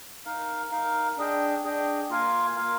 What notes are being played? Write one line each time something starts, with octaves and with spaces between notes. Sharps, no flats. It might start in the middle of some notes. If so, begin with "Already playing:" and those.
D#4 A#4 F5
D#4 A#4 F5
D4 G#4 D#5 G5
D4 G#4 D#5 G5
A#3 F4 A#4 F5 G#5
A#3 F4 A#4 F5 G#5